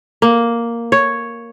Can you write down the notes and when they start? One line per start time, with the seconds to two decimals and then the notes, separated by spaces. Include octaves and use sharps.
0.22 A#3
0.92 C#5